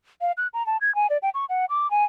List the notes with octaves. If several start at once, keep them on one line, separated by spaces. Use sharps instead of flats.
F5
F#6
A#5
A5
G#6
G#5
D5
G5
C#6
F#5
D6
G#5